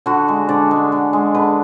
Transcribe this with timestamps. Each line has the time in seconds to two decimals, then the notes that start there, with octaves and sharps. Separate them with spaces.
0.06 D3 F#4
0.28 G#3
0.49 D3 D5
0.71 G#3
0.92 D3
1.13 G#3
1.34 D3 B4